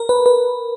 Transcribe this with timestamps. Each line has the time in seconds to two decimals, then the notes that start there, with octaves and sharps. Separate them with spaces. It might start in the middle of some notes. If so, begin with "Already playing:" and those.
Already playing: A#4
0.09 B4
0.26 B4